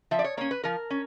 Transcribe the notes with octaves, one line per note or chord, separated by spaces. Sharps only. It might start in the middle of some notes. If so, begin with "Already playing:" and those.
F3 E5
D5
C#5
A#3 C#4 C#5
B4
F3 A#4
C#4